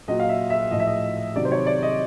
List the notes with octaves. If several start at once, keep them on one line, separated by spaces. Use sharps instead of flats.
A#2 F#3 D#5
F5
E5
E5
A2 F3 D#5
E5
D#5
C3 D#3 F#3 D5
C5
C#5
D5
D#5